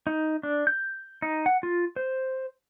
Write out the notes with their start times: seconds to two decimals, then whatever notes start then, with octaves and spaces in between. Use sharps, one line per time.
0.07 D#4
0.43 D4
0.67 G6
1.22 D#4
1.46 F#5
1.63 F4
1.96 C5